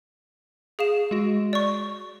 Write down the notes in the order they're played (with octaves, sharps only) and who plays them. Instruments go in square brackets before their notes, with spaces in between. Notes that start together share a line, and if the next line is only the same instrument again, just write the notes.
[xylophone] G#4 F5 E7
[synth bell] G#3 F#4
[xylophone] D5 C#6